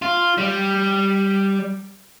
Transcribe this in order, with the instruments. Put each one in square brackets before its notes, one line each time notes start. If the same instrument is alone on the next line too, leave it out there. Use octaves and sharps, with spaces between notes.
[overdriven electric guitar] F4
G3